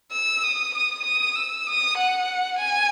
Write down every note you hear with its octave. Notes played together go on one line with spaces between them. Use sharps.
E6
D#6
D#6
D#6
E6
D#6
F#5
G#5